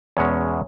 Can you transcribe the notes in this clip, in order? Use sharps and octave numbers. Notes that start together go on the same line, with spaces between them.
E2 B2 G#3 C#4 C#5